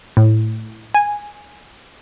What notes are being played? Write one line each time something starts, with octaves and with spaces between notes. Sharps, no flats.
A2
G#5